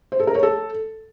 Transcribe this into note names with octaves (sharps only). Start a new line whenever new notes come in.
C5
A4
A#4
C#5
A4